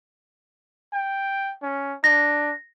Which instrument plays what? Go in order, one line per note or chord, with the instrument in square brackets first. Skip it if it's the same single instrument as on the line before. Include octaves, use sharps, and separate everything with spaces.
[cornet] G5
C#4
[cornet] D4 [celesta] A#6